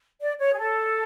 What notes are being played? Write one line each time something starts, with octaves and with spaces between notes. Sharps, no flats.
D5
C#5
G#4
A4